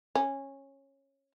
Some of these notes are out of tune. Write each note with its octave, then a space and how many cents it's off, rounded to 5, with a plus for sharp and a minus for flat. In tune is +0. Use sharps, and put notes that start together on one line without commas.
C#4 -15